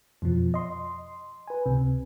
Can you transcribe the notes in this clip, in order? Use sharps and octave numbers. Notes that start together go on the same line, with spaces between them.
F2 B2 F3
D#5 C6
B4 G#5
C#2 C3